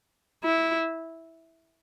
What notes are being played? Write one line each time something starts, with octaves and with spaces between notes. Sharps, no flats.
E4